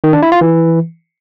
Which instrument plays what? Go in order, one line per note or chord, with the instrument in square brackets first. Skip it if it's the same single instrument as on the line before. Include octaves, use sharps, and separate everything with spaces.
[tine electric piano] D#3
D4
E4
F4
E3